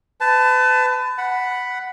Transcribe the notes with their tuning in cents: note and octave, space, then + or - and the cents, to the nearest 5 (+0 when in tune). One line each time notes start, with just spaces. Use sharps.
B4 +35 A5 +0
F#5 +0 B5 +0